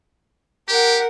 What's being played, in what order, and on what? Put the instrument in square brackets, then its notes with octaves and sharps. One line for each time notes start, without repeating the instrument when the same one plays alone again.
[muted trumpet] G4 [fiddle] A#4 F#5